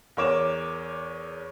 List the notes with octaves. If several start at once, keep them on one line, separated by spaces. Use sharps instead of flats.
E2 A#4 C#5 D6 E7